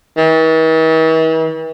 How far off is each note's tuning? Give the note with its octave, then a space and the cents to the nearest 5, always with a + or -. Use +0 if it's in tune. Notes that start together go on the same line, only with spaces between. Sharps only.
E3 -45